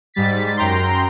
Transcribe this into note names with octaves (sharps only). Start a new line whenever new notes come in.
G#2 G3 A6 B6
F#2 G5 A#5 C6